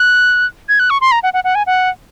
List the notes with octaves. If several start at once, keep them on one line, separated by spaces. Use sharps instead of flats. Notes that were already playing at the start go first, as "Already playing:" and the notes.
Already playing: F#6
G#6
F#6
C#6
C6
A#5
F#5
F#5
F#5
G#5
F#5